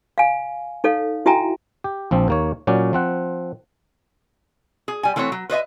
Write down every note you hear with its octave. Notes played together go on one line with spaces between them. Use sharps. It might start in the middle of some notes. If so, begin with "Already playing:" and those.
F5 G#5
D#4 A4 C#5 F5
E4 F#4 E5 G5 G#5 A#5
G4
A#1 F3 C4
D#2 A#3 C#5
A#2 F#3 C#4 D5
F3 C4 F#5
G#4
G3 G#5
E3 A3 C4 F#4 C#5
F#3
B4 C5 D#5 E5